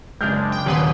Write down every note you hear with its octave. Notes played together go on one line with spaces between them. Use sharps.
F#1 G#3 D4 F6 G6
G5
D#1 G#4 B4 C6
C#3